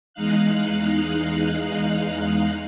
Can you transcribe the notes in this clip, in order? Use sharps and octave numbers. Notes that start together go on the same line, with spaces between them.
E2 G#3 D#4 F5 F#6